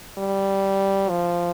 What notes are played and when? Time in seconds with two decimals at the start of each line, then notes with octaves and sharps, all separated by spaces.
0.18 G3
1.09 F3